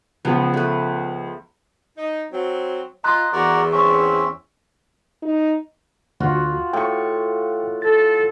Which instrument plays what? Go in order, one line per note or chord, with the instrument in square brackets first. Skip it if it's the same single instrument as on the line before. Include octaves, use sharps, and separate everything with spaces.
[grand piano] C#2 F3 [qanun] B3
[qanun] A3 B4
[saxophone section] D#4
F#3 C4
[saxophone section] F4 [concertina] D#5 [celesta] A#5 C6 F#6
[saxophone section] E2 [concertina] F#4 A#4 D5
[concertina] C4 C#4 E5 [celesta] C#6
[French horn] D#4
[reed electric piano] D2 [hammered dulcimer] F4 F#4
[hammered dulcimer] A2 C#6 [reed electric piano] G5
[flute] A4 [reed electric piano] A6